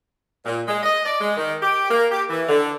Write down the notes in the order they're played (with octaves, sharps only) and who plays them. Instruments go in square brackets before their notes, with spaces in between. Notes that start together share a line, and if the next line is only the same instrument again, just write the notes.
[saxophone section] A#2
G#3
D#5
D5
G#3
D#3
G4
A#3
G4
E3
D3